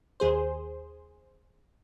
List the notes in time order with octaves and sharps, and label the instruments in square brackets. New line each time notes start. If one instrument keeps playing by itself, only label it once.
[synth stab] D#2 G#4 C5